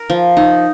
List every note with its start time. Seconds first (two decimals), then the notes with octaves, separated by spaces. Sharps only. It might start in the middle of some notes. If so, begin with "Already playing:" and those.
Already playing: A#4
0.10 F3
0.37 D#4